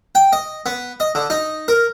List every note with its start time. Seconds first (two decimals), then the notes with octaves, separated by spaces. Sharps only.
0.15 G5
0.33 D#5
0.66 B3
1.00 D#5
1.15 D3
1.30 D#4
1.68 A#4